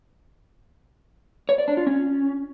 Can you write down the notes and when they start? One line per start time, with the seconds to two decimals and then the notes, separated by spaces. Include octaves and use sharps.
1.49 C#5
1.58 D5
1.68 D4
1.77 F4
1.87 C#4